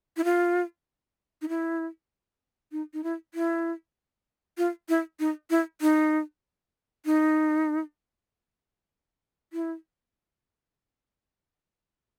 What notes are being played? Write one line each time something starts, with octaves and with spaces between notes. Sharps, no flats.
E4
F4
D#4
E4
D#4
D#4
E4
E4
F4
E4
D#4
E4
D#4
D#4
E4